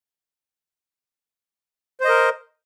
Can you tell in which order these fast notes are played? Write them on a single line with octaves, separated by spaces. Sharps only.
C5 D#5 A#4